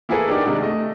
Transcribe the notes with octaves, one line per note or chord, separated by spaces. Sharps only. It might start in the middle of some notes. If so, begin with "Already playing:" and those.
A#3 E4 F#4 G#4 A4 B4
D4 D#4 G4 A#4 D5
C3 D#3 G#3 D4 F#4
A3 D#5